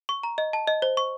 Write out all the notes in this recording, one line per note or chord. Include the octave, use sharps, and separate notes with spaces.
C#6
A#5
D#5
A5
D#5
C5
C#6